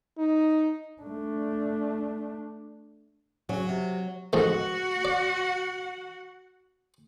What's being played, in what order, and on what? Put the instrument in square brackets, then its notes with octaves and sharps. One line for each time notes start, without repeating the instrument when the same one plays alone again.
[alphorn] D#4
[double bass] A3 D4
[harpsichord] C#3 F#4 [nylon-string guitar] F#3
[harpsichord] C3
[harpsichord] F2 G#2 D#3 [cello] F#4 F#5
[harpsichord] D5